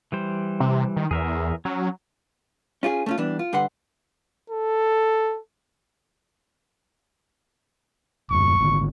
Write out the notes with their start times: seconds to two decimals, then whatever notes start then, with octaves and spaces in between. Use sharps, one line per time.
0.12 E3 G3 C5
0.60 C3
0.96 D#3
1.11 E2 G#4 A#4 E5
1.65 F#3 C#4
2.83 C#4 F4 F#4 G#4
3.06 A3 C#4 F4
3.18 E3 G3 B3 D4
3.39 F4
3.53 G2 D3 B4 F#5 C6
4.50 A4
8.30 D#1 F#2 C#6
8.60 G#1 D3